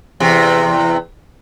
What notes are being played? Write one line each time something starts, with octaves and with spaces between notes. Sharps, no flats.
E2 C3